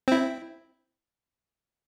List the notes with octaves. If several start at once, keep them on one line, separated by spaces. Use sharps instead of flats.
C4 E4